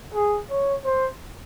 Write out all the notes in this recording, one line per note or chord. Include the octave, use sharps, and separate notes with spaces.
G#4
C#5
C5